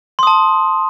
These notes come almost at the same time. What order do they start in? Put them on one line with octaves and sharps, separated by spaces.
C6 D#6 A5